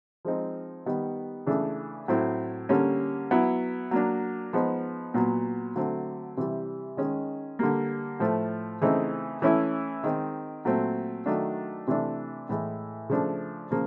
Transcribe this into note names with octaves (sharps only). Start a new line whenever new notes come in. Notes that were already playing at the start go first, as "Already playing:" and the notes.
F3 G#3 C4 D#4
D#3 G3 B3
C#3 E3 A3 D4
A2 F#3 A3 C4 E4
D3 G3 A#3 C#4
F#3 B3 E4
F#3 A#3 D4
F3 G#3 B3 D#4
A#2 F#3 B3
D3 F#3 A3 C4
C3 E3 G3
D#3 G#3 C#4
D3 G3 A#3
A2 F3 A3
C#3 E3 A3 C4 D#4
E3 A3 C#4 E4
D#3 G#3 C4
A#2 F#3 A3 C4
D#3 F#3 A3 D4
C3 E3 A3 D4
A2 E3 G#3
C#3 F3 A3 D4
C#3 F3 A#3